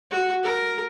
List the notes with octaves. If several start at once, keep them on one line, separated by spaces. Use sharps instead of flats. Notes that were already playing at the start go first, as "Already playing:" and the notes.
F#4
A#4